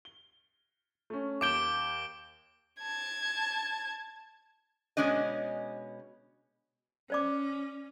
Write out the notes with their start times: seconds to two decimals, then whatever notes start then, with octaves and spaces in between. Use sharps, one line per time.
0.05 G7
1.10 A3 C#4
1.41 D#2 D6 G6 D7 E7 G7
2.81 A5 G#6
4.97 B2 G#3 C#4 D4 D#5
7.10 C#4 C5 D5 D6